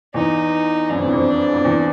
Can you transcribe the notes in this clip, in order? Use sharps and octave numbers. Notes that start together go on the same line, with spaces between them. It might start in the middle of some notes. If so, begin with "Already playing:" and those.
E2 D#4
F#2 D4
F2
E2
F2
F2
E2